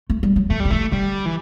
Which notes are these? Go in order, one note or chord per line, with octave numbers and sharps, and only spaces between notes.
A3
G3
F#3
E3 A3
D3 G3
E3 A3
D3 G3
E3